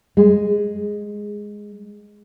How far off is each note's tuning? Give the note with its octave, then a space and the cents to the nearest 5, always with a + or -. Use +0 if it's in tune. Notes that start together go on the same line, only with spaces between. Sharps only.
G#3 -5